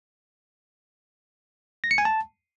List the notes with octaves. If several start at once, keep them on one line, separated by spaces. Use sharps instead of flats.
A#6
C#7
G#5
A5